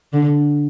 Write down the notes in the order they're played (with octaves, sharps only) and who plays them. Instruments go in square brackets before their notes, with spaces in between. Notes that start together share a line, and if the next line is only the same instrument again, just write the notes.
[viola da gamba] D3